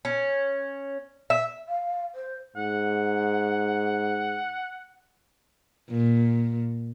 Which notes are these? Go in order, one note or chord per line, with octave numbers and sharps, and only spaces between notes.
C#4
E5
F5
C5
G#2 F#5
A#2